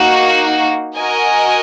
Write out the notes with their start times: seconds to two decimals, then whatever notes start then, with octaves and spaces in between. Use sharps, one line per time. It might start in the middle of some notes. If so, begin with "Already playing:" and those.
Already playing: A#3 D#4 F#4
0.97 F#4 A#4 D#5 G#5